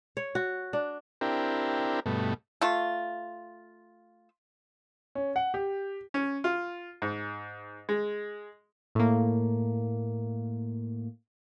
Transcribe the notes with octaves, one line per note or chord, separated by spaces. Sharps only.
C#5
F#4
D4
C4 D4 E4 G4 A#4
G2 B2 A3
A3 F4
C#4
F#5
G4
C#4
F4
G#2
G#3
A2 A#3